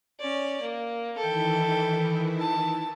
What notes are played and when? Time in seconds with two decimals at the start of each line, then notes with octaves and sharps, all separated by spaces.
0.20 C#4 D5
0.62 A#3
1.18 D#3 E3 E4 A4 G5
2.40 A5